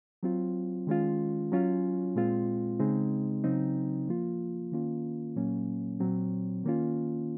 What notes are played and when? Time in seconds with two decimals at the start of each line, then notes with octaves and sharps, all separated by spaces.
0.23 F#3 C4 F4
0.87 D#3 G#3 C#4 F4
1.52 F#3 C#4 F4
2.16 A#2 G#3 C4 F4
2.80 C#3 G#3 C4 D#4
3.44 C#3 F#3 C4 D#4
4.08 F3 A#3 F4
4.72 D#3 A#3 C#4 F4
5.36 A#2 F#3 A#3 C#4
6.00 A#2 F#3 C4
6.64 D#3 A#3 C#4 F4